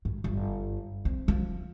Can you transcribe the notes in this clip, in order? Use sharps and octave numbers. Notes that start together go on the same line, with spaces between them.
G#2
G1
C4
F3